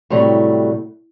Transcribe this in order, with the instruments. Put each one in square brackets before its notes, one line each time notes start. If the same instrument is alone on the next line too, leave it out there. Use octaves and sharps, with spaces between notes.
[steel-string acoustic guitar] A2 C3 F#3 G3 A3